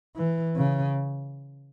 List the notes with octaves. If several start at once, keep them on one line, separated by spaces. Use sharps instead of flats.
E3
C#3